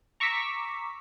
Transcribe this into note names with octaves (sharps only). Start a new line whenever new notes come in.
A#5 C#6 D6 E6 B6